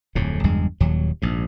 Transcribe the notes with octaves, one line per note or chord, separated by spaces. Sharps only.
D1 F2 A2
F#1 E2 G2 G#3
D#1 D#2 F#3
A#1 G#2